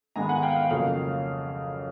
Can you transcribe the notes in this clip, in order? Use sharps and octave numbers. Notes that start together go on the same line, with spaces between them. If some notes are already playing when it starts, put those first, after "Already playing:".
G#2 D#3 G#3 B3 G#5 A#5
F#5 G#5
F5 G5
F5
F2 C#3 F#3 A#3 F5